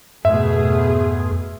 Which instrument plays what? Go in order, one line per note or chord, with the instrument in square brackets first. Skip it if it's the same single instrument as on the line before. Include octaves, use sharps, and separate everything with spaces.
[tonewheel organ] F2 G#2 [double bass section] B2 A3 B3 [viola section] G#4 [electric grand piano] E5